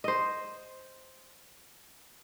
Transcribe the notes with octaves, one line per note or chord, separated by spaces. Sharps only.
C5 D#5